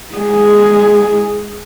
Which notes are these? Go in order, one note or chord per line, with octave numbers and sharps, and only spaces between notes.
G#3 G#4